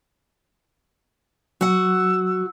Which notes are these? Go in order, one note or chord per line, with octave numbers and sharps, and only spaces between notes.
F#3 F#4 F#5 E6